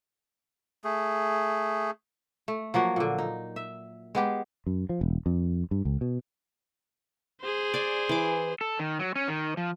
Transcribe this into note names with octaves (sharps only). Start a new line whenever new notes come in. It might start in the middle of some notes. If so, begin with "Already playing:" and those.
A3 G#4
A3
F3 F#3 A#3 F#4
A#2 D3
D#4
E5
G#3 B3 G4
F#2
F3
E1
F2
G2
C#2
B2
G#4 C5
D5 G#5
E3 D6
A4
D#3
F#3
C#4
D#3
F3